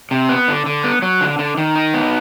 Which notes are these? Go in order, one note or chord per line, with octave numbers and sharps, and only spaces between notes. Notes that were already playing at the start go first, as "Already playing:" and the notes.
C3
B3
D3
D3
B3
F#3
D3
D3
D#3
D#4
B3